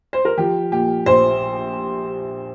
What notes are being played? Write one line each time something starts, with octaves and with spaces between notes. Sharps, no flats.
C5
A#4
F3 G4
A#2 G4
A#1 C5